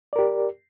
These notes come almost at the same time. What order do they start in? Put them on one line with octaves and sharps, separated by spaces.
D5 A#4 G4